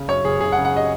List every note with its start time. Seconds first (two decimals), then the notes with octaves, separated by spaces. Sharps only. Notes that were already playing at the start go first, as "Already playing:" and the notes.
Already playing: C#3
0.08 F#2 C#5
0.25 F#1 G#4
0.41 F#1 G#4
0.52 F#5
0.57 C#3
0.65 F#5
0.76 D#5